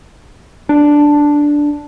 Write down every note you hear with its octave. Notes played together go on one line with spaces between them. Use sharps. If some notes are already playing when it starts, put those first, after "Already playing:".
D4